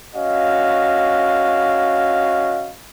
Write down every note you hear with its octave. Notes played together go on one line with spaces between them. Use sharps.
C#4 F#4 D#5 F5